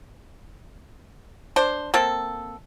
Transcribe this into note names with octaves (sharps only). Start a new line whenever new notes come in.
D4 C5
A#3 C4 A4